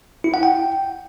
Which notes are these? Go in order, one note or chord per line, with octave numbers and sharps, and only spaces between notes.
E4
F#5
G5